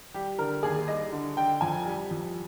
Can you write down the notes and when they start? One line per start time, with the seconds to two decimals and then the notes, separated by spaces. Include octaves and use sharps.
0.14 G3 G4
0.39 D3 A#4
0.63 D#2 G#4
0.88 G3 D#5
1.12 D3
1.37 D3 G5
1.61 F2 G#5
1.86 G3
2.10 F2